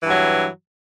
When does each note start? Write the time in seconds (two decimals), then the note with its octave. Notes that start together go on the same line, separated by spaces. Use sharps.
0.01 E3
0.06 G2
0.11 F#3